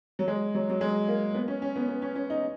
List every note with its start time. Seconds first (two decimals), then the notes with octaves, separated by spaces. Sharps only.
0.19 F#3
0.28 G#3
0.55 F#3
0.70 F#3
0.81 G#3
1.08 A#3
1.35 B3
1.48 C#4
1.62 C#4
1.76 B3
1.88 B3
2.02 C#4
2.15 C#4
2.30 D#4